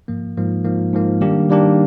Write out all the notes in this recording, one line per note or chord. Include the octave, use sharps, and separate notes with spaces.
G#2 F3 A#3
G#2 F3 A#3
G#2 F3 A#3
G#2 F3 A#3
D#3 G3 A#3 D4 G4
D#3 G3 A#3 D4 G4